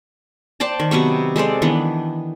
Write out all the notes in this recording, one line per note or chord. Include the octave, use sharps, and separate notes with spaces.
C5 D5 G5 A5
D#3
C3 F#3 B3 C#6
G#3 A4 C5 D5
D#3 E3 B3 D4